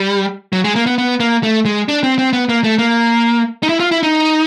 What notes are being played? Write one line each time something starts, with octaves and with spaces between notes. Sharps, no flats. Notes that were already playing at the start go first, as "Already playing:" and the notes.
Already playing: G3
F#3
G#3
A#3
B3
B3
A#3
A3
G#3
D4
C4
C4
B3
A#3
A3
A#3
D#4
E4
F4
E4
D#4